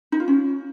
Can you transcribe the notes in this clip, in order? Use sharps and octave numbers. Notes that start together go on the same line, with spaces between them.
D#4
F4
C#4